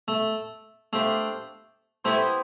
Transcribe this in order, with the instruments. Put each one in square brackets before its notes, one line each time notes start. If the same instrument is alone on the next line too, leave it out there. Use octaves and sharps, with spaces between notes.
[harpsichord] A3
[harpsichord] A3 [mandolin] D4 G4 C5 F5
[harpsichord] A3 [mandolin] B3 E4 G4 C5